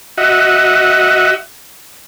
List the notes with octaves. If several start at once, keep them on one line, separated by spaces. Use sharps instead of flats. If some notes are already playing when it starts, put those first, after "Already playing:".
F#4 D#5 E5 F#5